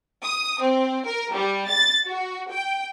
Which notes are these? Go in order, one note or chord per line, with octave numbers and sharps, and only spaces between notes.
D#6
C4
A#4
G3
A6
F#4
G5